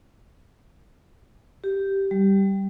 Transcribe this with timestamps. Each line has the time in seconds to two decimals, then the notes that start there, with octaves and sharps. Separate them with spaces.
1.64 G4
2.11 G3